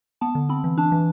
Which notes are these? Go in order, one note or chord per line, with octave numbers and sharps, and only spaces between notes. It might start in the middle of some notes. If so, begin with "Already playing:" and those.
B3 A5
D3
C4 B5
E3
D4 A5
E3